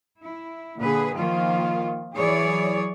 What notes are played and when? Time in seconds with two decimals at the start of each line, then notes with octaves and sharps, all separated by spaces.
0.20 E4
0.78 A#2 D3 G#4 B4
1.16 D#3 F3 A#3 F4
2.15 E3 F#3 G#4 C#5 D5